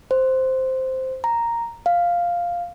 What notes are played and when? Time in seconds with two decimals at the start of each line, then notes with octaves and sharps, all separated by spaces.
0.11 C5
1.24 A#5
1.86 F5